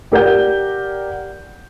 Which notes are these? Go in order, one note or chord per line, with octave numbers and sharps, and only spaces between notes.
G4 A#4 D5 F#5 G6